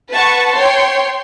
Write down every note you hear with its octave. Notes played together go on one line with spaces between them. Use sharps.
B4 F#5 A5 C#6
C#5 G5 C6